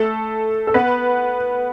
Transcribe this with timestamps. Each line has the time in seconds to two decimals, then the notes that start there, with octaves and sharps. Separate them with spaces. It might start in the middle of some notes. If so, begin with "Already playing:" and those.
Already playing: A3 A4
0.67 A4
0.74 B3 B4